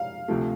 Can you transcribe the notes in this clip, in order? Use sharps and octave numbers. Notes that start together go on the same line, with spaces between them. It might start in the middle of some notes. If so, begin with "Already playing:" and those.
Already playing: F5
D2 C3 F3 A3